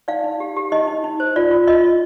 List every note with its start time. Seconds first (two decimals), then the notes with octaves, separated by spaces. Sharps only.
0.08 D#4 D5 F5
0.24 D#4
0.40 G4
0.56 G4
0.72 D#4 D#5
0.87 D#4
1.04 D#4
1.20 C5
1.36 F4 D5
1.51 F4
1.67 F4 D#5
1.84 F4